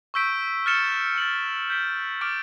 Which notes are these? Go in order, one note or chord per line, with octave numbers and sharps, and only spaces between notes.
C#6 E6 G6 B6 D7
F6 A6 C#7 E7 G7
A6 C#7 F#7
G6 B6 D7 G7
D6 F6 A6 D7